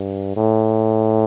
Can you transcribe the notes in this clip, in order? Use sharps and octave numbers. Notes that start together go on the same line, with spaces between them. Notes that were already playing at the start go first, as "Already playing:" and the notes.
Already playing: G2
A2